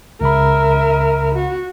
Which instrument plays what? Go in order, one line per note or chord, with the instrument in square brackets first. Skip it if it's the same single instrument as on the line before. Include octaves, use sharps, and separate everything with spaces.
[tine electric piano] C#2 C#3 B5 [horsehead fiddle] A#4 E5
[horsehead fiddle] F#4